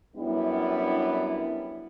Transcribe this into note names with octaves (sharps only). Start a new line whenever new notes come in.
F#2 G3 B3 D4 E4